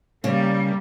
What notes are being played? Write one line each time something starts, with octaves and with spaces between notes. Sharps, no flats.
C#3 G3 A#3